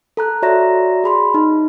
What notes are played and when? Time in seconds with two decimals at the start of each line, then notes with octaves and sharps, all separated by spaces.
0.17 A4 A#5 F#6
0.42 F#4 C#5 D5 E5 A#5 A#6
1.04 G#4 B5 C6
1.34 D#4